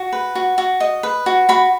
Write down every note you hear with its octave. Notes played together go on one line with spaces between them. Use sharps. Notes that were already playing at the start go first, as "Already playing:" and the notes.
Already playing: F#4
B4
F#4
F#4
D#5
B4
F#4
F#4 B5